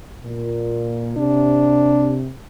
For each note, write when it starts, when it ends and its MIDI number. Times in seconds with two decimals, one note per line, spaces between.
0.24 1.16 46
1.17 2.31 48
1.17 2.19 62